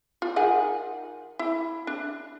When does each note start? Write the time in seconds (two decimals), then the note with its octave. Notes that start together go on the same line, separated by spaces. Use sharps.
0.22 F4
0.36 D#3 G#4 F#5
1.39 E4
1.87 D4